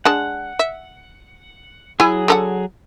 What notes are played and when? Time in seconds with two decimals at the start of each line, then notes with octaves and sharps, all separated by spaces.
0.05 G#3 D4 F#5 A5
0.59 E5
2.00 F#3 E4 G#4 G#5
2.28 D3 A4 F#5